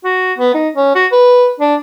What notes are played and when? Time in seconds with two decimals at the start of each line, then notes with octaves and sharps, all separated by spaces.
0.04 F#4
0.38 B3
0.54 D#4
0.76 C#4
0.95 F#4
1.12 B4
1.60 D4